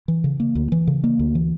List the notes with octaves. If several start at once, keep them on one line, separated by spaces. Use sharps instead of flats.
E3
C#3
A#3
D2
E3
C#3
A#3
D2
E3